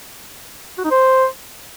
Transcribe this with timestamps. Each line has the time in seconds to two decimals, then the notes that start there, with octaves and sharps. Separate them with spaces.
0.78 F#4
0.85 D#4
0.91 C5